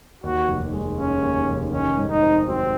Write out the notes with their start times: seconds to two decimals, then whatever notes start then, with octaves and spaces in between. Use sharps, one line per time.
0.23 D#2 F#4
0.48 F1
0.73 G#3
0.98 C#3 C#4
1.22 D#2
1.47 F1
1.73 D#3 C#4
1.97 G#2
2.10 D#4
2.22 C4
2.47 F#3 C4